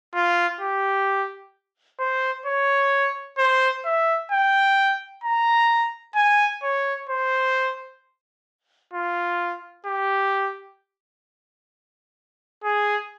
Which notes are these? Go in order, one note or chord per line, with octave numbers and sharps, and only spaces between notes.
F4
G4
C5
C#5
C5
E5
G5
A#5
G#5
C#5
C5
F4
G4
G#4